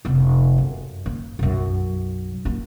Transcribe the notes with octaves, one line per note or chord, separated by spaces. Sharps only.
F1 B3
F#2
A#3
B1 F#2
A#3 F4